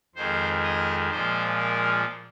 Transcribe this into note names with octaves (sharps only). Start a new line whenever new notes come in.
F2 D#3 G#3 C5
D#5
A#2 F3 G#3 C5
A#4